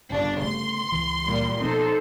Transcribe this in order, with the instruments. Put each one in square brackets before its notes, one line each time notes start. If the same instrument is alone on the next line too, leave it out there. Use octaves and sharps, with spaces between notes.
[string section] G1 C#3 D4
[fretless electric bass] C#3 A3 [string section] C6
[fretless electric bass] C#2 E3
[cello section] A#2 G3
[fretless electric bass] B2 F3 C4 [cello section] D#4 A4 C5